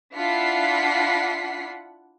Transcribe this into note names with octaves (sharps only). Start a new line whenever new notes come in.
D4 E4 F4 F#5 B6 C7